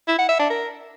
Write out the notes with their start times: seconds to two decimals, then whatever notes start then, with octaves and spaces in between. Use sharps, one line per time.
0.08 E4
0.18 F#5
0.29 E5
0.39 D4
0.50 A#4